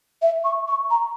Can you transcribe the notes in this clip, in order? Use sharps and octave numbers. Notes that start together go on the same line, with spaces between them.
E5
C#6
C#6
A#5